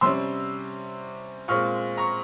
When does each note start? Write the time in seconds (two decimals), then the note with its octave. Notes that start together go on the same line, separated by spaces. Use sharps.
0.01 C3 G3 C#4 C6 E6
1.48 A#2 G#3 C4 C#6 F6
1.97 A#5 C#6